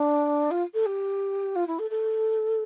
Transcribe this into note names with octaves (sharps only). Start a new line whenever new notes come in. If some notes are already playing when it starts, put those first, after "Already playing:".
Already playing: D4
F4
A4
G4
F4
E4
A4
A4